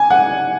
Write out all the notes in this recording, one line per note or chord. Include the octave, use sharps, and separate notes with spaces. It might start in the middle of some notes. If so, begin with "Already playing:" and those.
Already playing: G#5
F#5